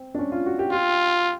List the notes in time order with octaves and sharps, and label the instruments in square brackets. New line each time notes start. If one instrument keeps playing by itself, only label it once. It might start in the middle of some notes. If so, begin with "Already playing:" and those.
Already playing: [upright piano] C4
D4
C#4
F4
F#4
G4
[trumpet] F4 [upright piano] G4